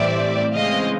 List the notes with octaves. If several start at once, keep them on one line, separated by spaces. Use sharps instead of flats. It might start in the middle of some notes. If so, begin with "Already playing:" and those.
Already playing: A2 E3 G3 C4 D5 E5
C#3 E3 G#3 C4 D#5 F5